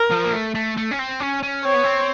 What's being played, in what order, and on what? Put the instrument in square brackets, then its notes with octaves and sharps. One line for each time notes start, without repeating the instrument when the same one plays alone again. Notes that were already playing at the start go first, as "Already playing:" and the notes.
Already playing: [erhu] A#4
[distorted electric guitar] F3
A#3
A3
A3
A3
C#4
C4
C#4
C#4
[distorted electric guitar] C4 [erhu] C#5
[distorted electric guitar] B3
C4